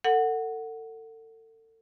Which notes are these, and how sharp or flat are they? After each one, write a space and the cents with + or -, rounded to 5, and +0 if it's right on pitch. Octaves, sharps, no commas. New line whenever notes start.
A4 +35 F#5 +0